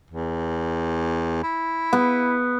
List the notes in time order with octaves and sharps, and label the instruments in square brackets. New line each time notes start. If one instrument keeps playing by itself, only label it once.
[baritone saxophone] E2
E4
[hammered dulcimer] B3